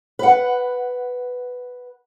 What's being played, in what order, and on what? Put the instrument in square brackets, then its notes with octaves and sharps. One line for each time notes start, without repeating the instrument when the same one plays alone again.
[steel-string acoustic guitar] B4 F#5